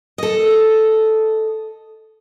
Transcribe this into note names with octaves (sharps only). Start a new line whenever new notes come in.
A4 D#5